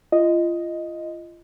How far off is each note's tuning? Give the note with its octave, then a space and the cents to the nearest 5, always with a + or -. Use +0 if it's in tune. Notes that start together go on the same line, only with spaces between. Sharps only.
F4 -30 D#5 +0